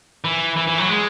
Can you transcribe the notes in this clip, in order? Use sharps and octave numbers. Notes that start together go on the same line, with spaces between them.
E3
E3
E3
F#3
G#3